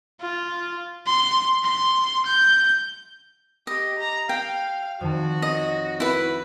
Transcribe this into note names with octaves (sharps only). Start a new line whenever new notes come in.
F4
C6
C6
G6
G4 D#5
A#5
F5 G5
F2 D#3 F#4 A5
C#5 D#5
E4 B4